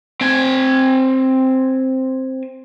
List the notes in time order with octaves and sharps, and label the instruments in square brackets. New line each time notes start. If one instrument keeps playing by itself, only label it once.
[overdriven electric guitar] C4 G#5